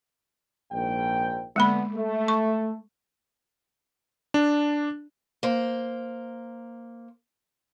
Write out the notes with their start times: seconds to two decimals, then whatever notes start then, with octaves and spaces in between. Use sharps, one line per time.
0.71 A#1 G#2 G5
1.56 D3 G#3 A#3 B3 B5
1.94 A3
2.28 C#6
4.34 D4
5.43 A#3 C5